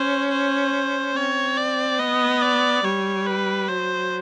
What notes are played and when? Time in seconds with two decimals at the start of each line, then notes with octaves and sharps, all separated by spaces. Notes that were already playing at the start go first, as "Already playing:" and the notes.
Already playing: C#4 C5
0.31 C5
1.15 C4 C#5
1.57 D5
1.99 B3 D#5
2.42 D5
2.84 G3 C#5
3.26 B4
3.68 F#3 C5